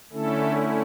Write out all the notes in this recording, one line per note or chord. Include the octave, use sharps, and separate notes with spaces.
D3 A3 C#4 E4 A4